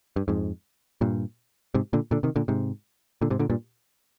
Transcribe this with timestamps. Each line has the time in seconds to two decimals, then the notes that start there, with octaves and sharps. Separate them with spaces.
0.16 G2
0.28 F2 G#2
1.01 G2 A#2
1.74 G#2 C3
1.93 A#2 D3
2.11 A#2 D3
2.23 C3 D#3
2.36 A#2 D3
2.48 G#2 C3
3.21 A#2 D3
3.30 G#2 C3
3.39 A#2 D3
3.50 G2 A#2